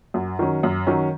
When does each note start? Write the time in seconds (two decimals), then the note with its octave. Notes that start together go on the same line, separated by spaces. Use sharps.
0.14 F#2
0.39 D#3 F#3 C#4
0.63 F#2
0.87 D#3 F#3 C#4